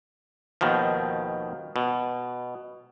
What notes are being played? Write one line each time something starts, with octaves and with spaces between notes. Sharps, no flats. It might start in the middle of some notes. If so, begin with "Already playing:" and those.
D#2 B2 D#3 F3
B2